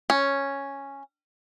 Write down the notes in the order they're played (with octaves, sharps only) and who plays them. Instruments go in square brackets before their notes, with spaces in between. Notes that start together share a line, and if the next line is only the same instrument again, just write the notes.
[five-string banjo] C#4